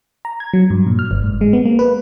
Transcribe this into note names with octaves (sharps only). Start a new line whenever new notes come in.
A#5
G#6
F#3
G2
A#2
F6
G1
G#2
G#3
B3
A#3
B4